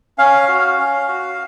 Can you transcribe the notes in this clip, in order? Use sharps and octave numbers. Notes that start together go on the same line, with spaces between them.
C#4 F5
F#4
C#4
F#4